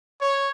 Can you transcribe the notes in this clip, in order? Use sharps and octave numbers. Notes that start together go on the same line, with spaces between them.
C#5